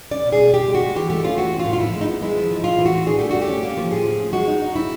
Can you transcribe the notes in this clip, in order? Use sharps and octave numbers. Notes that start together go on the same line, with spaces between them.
C#4 D5
B2
G#4
B2
B2 G4
G#3
F#4
G#3
E3 G4
A3 G4
C#4 F4
E3 F#4
C#4
F4
A2
F4
F3 E4
G#3
D#4
B3
G#3 E4
F3
F3
A2 F4
E3
F#4
A2
D4 G#4
A3 G4
D4 F#4
G4
C#4
A#3
F3
A2 G#4
F3
C#4
G#3 F#4
D#4
D#4
C4 E4